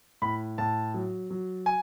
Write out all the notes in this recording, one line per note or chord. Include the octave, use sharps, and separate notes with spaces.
A2 B5
A2 A5
F#3
F#3
G#5